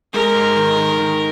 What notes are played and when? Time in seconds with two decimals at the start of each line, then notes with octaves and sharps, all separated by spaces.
0.14 G#3 A#4
0.35 G#2
0.56 D#3
0.77 D#3
0.99 D#3